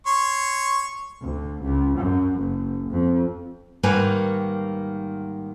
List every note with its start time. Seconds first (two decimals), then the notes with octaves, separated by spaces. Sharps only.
0.07 C#5 C6 C#6
1.21 D2
1.62 C#2
1.99 F#2
2.39 F#1
2.91 F2
3.83 G#2 D#3 G3 A#3 B4 G#5